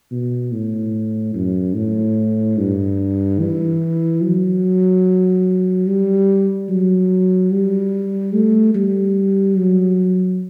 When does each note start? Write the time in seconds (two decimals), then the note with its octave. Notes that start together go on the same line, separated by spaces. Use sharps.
0.11 B2
0.52 A2
1.34 F#2
1.75 A2
2.58 G2
3.40 E3
4.22 F#3
5.87 G3
6.69 F#3
7.51 G3
8.33 A3
8.75 G3
9.57 F#3